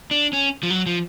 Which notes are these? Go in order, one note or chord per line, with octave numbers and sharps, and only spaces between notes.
D4
C#4
F3
F#3
F3